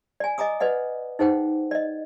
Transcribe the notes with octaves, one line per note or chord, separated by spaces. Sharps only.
D5 G#5
D#5 G#5 A#5 D6 D#6
B4 D5 D#5 F#5
D#4 G#4 C5 F#5 G5
D5 D#5